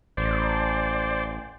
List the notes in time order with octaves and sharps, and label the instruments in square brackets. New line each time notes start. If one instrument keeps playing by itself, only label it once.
[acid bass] A1 [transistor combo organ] C5 D5